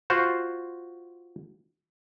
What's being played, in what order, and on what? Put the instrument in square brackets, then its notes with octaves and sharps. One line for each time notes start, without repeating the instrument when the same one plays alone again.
[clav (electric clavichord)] F4 F#4 C5